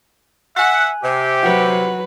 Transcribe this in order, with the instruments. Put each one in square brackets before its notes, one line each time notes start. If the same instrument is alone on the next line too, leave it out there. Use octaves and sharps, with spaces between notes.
[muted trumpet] E5 [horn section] F#5 [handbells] G#5 F#6
[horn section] C3 [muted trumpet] G4
[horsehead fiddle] F#3 B4 [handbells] F#5